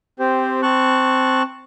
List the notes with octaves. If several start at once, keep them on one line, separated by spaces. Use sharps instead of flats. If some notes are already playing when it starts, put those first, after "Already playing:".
C4 G4 C5
C4 A5 C#6 F#6